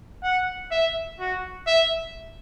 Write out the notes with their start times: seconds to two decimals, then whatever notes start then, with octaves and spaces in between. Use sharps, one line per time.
0.23 F#5
0.71 E5
1.20 F#4
1.67 E5